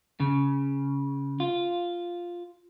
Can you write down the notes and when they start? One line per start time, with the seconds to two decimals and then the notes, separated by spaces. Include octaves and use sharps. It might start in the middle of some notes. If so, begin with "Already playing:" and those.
0.20 C#3
1.40 F4